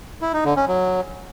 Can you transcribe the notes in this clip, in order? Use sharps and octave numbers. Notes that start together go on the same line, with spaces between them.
E4
D#4
D3
C#4
F#3